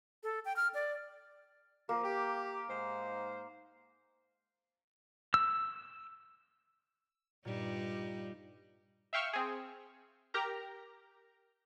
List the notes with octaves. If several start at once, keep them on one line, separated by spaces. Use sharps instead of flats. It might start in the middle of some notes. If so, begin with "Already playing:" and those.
A4
G5
F6
D5
F3 A#3
G4
G#2 D#4 C5
E6
G2 A#2 G3 D#4
E5 F5 G5 C#6 E6 F6
C4 G#4
G4 A#4 A#5